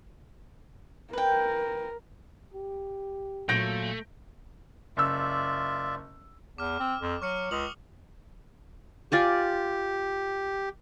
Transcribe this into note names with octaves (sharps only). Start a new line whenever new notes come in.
A#4 B4 G5
G4
A#2 F#3 A3 G6 A#6 D7
F#1 F4 D5 E5 E6
E2 D6 F6
C4
F2
F#3 C#6 F6 C#7
C#2 D#6 F7 F#7
F4 G4 D5 G#5